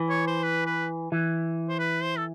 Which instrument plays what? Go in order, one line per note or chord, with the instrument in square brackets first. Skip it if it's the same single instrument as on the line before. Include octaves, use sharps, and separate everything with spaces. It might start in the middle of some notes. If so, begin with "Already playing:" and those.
Already playing: [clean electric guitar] E3
[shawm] C#5
C5
B4
B4
[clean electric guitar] E3
[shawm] C5
B4
C5
A4